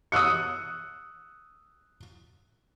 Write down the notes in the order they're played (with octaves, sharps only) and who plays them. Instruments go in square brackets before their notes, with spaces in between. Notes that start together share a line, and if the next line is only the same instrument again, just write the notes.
[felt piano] D#6 E6 F#6 C#7